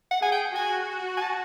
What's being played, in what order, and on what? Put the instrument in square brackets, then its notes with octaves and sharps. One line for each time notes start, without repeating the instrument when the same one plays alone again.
[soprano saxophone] F#5
[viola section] G#4 [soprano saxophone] G#5
[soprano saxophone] G5
[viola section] F#4 [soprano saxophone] G#5
[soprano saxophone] G#5
A5